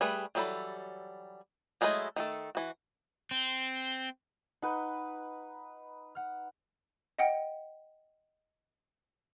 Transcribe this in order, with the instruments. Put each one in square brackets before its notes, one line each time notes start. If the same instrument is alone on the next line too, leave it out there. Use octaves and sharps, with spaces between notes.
[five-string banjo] G3 A3 G#4 B4
E3 F#3 G3 A4 B5
F#3 G#3 A3 E4 D#5
D#3 A3 A4
E3 F#4
[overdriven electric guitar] C4
[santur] D#4 B4 [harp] F#5 G6
[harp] F#5 F6
[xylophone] D#5 F#5 G5